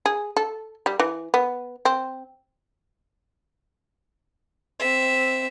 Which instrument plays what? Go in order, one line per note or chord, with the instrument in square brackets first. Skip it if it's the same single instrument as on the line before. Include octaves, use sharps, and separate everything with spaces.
[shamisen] G#4
A4
G3
E3
B3
C4
[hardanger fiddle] C4 E5